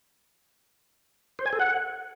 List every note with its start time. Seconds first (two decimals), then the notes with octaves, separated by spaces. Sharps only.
1.39 C5
1.46 G#5
1.53 A4
1.60 F#5